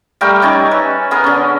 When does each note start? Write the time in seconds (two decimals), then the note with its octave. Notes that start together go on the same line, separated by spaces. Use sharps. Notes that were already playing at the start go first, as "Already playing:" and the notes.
0.21 G3 A3 A#4 G5
0.42 C#4 D#4 D5 G#5
0.71 B4 E5
1.11 B3 G#4 A#4
1.24 D3 C#4